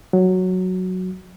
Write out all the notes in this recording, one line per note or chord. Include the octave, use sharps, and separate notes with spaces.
F#3